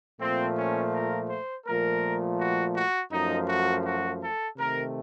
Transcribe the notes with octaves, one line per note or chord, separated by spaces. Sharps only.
A#2 F3 A3 C4
C#4
A#4
C5
A#2 F3 A3 A#4
F#4
F#4
F#2 F3 A3 D#4
F#4
F#4
A4
C3 D#3 A3 A#4